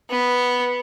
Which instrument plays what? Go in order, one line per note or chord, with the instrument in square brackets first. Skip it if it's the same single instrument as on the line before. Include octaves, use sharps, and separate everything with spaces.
[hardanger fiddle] B3